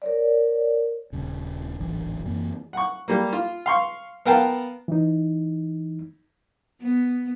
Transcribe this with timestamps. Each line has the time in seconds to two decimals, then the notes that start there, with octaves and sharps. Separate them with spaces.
0.02 A#4 C#5 D5
1.12 D#1 C#3
1.79 D1 G#1 D3 E3
2.26 F#2 E3 A#3 C4
2.73 F#5 C#6
3.08 G3 A#3
3.33 F4
3.66 F5 C6 C#6
4.26 B3 A#4 F5 G5 A5
4.88 E3 D#4
6.81 B3